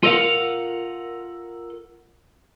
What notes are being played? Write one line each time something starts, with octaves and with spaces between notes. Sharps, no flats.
F4 A4 A#4 D5 F5 F#5